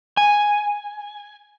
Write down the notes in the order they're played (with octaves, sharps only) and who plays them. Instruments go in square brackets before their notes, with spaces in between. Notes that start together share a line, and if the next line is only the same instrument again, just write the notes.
[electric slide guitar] G#5